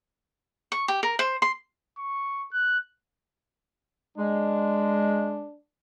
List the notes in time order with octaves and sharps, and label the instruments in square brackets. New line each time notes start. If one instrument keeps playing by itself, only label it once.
[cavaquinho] C#6
G4
A#4
C5
C6
[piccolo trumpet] C#6
F#6
[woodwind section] G#3 [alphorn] D4